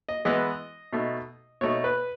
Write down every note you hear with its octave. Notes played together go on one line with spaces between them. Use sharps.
D#5
E3 G#3 B3 E4 D#5
B2 A3 D#4
B2 A3 D#4 C#5
B4